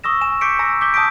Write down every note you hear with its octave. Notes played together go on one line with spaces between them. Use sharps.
C#6 D#6 E6 A#6 E7
G#5 E7
C#6 D6 G6 B6 C#7 D7
G#5 A#5 E6 A#6
D6 G6 B6 G7
A5 D#6 G6 B6 D7